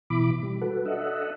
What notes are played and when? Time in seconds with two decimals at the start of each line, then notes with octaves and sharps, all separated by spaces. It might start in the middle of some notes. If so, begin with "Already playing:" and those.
0.10 B2 E3 E4 B5 D6
0.43 G3
0.61 F#4 A4 B4
0.85 D4 A4 D#5 E5 F#5